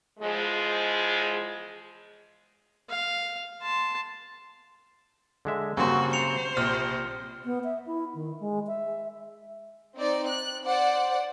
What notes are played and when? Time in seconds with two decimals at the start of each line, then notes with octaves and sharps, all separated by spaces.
0.20 E2 F3 G#3
2.89 F5
3.62 A5 C6
5.45 D3 G#3 E5
5.77 G2 C#3 F#3 A#3 C4 F#4 C6
6.13 C5 C#7 F7
6.57 A#1 C3 F6
7.45 B3
7.64 E5
7.86 E4
8.15 D#3
8.40 G#3
8.67 E5
9.96 C4 D#4 D5
10.28 F#6
10.65 C5 D5 F#5